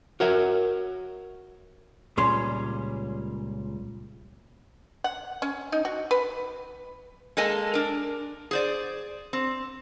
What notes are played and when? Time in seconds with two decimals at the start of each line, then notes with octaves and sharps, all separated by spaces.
0.20 F#4 A#4 C#5 E5
2.17 C#2 A#2 G3 C#4 C6
5.04 F#5
5.42 C#4
5.72 D#4
5.85 F#4
6.11 B4
7.37 G#3 A#3 A4 D#5 G#5 A5
7.74 D4 A#4
8.51 G#4 C5 D5
9.33 C4